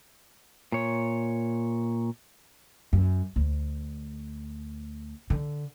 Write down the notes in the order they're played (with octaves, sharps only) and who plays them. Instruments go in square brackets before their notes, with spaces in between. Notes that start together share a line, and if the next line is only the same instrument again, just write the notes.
[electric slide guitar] A#2 C#5
[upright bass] F#2
D2
D3